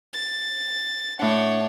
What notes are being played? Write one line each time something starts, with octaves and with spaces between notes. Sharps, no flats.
A6
A2 D4 C#5 F#5